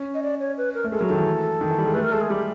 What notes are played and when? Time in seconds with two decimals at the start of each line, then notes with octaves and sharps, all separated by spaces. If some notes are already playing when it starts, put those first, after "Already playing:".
Already playing: C#4
0.14 D#5
0.23 D5
0.40 C#5
0.57 B4
0.74 A#4
0.84 A3
0.92 G#3 A4
0.99 F#3 A#4
1.06 D#3 A4
1.18 E3
1.61 D#3
1.70 E3
1.78 G3
1.87 G#3
1.94 A3 B4
2.03 A#4
2.12 G#3 A4
2.21 G#4
2.30 G3 G4